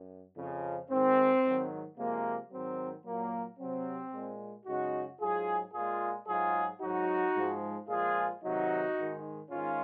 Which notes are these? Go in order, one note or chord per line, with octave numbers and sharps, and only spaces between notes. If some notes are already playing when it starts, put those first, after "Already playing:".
Already playing: F#2
F2 C#3 F3
G#2 D#3 G#3 C4
G#2 D#3 F#3
C3 F3 G#3 A#3
G#2 D#3 F#3 C4
A#2 F#3 A#3
C3 F#3 C4
A#2 G#3
F#2 C#3 G#3 D#4 F#4
G#2 F#3 F4 G#4
A#2 G#3 F4 G#4
G#2 F#3 F4 G#4
G#2 F#3 D#4 F#4
G#2 F3 G#3
A#2 F3 G#3 F4 G#4
C3 D#3 F#3 D#4 F#4
G#2 D#3 G#3
G#2 D#3 G#3 C#4 F4